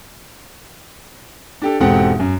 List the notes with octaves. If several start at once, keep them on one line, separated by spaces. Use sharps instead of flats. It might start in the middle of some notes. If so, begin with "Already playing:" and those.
D4 G4 A4
E1 G#2 C4 G4 A4 F#5
F#2